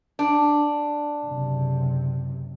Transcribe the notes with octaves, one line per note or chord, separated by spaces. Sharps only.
D4
F#1 C3